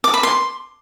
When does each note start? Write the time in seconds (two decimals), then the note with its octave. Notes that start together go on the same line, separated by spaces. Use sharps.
0.04 D6
0.14 B5
0.23 C6